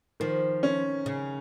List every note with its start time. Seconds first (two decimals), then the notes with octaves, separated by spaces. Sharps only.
0.20 D#3 F3
0.63 C#4
1.06 C#3